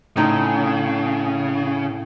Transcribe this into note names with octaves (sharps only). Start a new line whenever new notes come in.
A2 C#3 C4 D#4